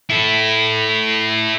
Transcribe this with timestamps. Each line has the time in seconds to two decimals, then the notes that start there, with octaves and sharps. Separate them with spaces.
0.10 E4 A4